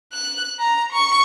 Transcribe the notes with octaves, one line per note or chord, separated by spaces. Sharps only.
F#6
A#5
C#6